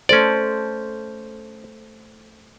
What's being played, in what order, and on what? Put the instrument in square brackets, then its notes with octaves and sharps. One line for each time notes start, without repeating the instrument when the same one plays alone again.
[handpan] A3 A4 C5 [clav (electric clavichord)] C#4 D5